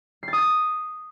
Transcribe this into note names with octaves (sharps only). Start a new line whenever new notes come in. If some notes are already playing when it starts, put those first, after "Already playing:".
C7
A6
D#6
A6